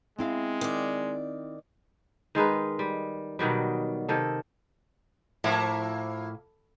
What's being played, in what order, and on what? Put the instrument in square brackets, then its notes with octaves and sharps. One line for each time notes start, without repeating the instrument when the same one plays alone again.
[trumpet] G#3 [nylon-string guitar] C4 E4 F5
[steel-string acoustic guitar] D#3 D5
[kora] D#3 G#3 D#4 B4
G3
B2 D#3 F#3 G3
C3 D#3 A4
[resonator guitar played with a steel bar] A2 [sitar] F3 A#3 E4